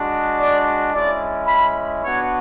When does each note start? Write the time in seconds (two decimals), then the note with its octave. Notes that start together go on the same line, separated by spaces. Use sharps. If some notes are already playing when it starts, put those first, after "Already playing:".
Already playing: G#3 D4 F#4
0.39 D5
0.93 G#3 C#4 E4 D5
1.46 B5
2.02 B3 D4 F#4 C#5